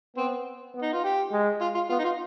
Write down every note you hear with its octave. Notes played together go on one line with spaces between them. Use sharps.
B3 C4
B3
D#4
F4
G4
G#3
F4
F4
B3 F4
D#4
F4